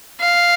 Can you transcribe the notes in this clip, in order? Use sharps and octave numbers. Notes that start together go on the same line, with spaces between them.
F5